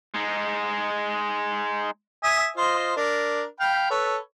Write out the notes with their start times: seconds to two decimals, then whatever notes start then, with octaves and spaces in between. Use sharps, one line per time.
0.14 G#3 D#4
2.23 E5 G#5 D#6
2.56 F4 C5 D#5
2.96 D4 A#4
3.60 F5 G5 B5
3.90 A4 B4 C#5